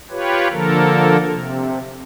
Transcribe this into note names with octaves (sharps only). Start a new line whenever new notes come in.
F4 G4 B4 C#5
D3 F3 A#3 A4 A#4
C3